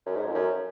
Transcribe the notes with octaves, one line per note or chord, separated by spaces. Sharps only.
F#2
G#2
F2
F#2